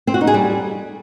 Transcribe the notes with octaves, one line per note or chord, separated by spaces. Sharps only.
C4
F#4
D#4
G#4
G3